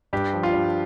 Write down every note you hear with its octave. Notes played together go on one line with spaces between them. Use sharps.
G2 G4
F3
F4
G2